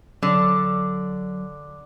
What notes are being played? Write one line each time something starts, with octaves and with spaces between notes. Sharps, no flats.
D3 F#3